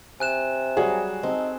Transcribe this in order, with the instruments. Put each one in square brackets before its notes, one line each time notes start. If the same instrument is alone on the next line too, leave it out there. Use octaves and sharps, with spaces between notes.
[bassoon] C3 [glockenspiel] G#5 F#6 E7
[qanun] F#3 G3 F#4 [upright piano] G#4
[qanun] C4 A4 [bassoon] D#4